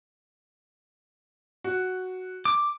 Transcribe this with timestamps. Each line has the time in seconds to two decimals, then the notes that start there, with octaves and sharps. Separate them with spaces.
1.64 F#4
2.45 D6